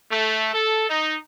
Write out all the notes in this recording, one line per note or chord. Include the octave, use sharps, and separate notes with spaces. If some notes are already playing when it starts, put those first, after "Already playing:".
A3
A4
D#4